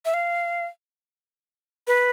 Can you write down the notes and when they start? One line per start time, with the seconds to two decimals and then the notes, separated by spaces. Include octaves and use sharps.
0.05 E5
0.14 F5
1.87 B4